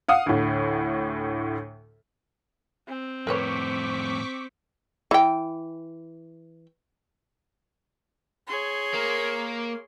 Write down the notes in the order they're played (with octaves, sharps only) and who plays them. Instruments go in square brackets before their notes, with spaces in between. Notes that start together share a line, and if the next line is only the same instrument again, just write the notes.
[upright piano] F5 F#5 D#6
D2 A2
[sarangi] C4
[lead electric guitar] F2 A2 [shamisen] A#4 B4 C#5 [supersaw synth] C#6 D6 B6
[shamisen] E3 G5
[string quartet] G#4 C#5 C6
[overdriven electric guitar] A#3